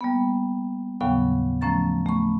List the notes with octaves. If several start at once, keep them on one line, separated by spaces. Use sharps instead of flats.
G3 A#3 B3
D#2 A2 C#3 F#3 B3 F5
F3 A3 C#4 A#5 A6
A3 B5 C#6